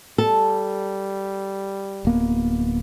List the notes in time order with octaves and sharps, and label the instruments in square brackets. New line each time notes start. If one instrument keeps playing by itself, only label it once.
[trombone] G3 [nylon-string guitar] A4
[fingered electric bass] D1 A#3 B3